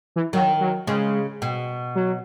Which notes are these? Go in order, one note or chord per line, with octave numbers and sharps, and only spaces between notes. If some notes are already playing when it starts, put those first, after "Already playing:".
E3
D#3 F#3
F#3
C#3 G#3
B2
F#3